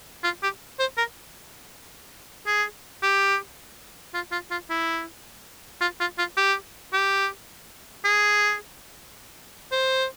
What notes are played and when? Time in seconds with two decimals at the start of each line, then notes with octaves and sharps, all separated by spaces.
0.24 F4
0.43 G4
0.79 C5
0.97 A#4
2.47 G#4
3.03 G4
4.14 F4
4.32 F4
4.51 F4
4.70 E4
5.81 F4
6.00 F4
6.18 F4
6.37 G4
6.93 G4
8.05 G#4
9.72 C5